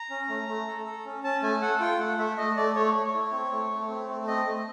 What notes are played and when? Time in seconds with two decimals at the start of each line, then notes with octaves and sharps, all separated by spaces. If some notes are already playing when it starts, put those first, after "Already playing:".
Already playing: A#5
0.10 C#4
0.29 A3
0.48 A3
0.68 A4
0.85 A4
1.05 C#4
1.24 C#4 A5
1.42 A3 G#5
1.62 A4 F#5
1.81 F4 G5
1.99 A3 F#5
2.19 A3 E5
2.37 A3 D#5
2.57 A3 D5
2.76 A3 C#5
2.94 A3
3.14 E4
3.32 C4
3.52 A3
3.71 A3
3.89 C4
4.09 A3
4.28 C4 D#5
4.46 A3